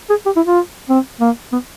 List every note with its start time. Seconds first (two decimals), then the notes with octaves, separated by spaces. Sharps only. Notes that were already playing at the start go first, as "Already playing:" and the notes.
0.09 G#4
0.26 G4
0.36 E4
0.47 F4
0.89 C4
1.20 A#3
1.52 B3